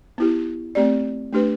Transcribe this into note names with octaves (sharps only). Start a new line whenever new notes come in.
B3 E4 G4
A3 C4 G4 D5
A3 D4 G4 B4